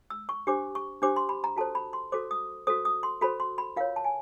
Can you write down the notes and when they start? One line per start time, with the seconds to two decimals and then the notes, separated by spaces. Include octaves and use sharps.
0.10 E6
0.29 C#6
0.47 D4 G4 C5 D6
0.75 C#6
1.02 D4 G4 C5 D6
1.16 C6
1.29 B5
1.44 A#5
1.56 F#4 A4 C5 A5
1.75 B5
1.93 C6
2.12 F#4 A4 C5 D6
2.31 D#6
2.67 F#4 A4 C5 D#6
2.85 D#6
3.03 C6
3.21 F#4 A4 C5 B5
3.40 C6
3.58 B5
3.76 F4 A#4 C#5 F5
3.96 A5
4.04 G#5